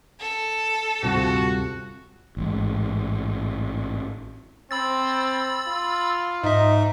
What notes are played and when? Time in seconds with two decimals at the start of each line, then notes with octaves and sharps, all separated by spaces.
0.20 A4
1.03 D2 G2 C3 G3 F4 F#4
2.37 A1 G#2
4.71 C4 B5 E6 A6
5.67 F4
6.44 G#2 D#4 E5